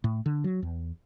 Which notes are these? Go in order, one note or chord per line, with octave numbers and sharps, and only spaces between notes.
A2
D3
F#3
E2